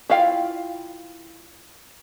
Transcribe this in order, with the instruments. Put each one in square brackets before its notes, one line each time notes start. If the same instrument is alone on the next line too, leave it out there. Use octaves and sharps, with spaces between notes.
[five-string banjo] E4 F4 F5 G5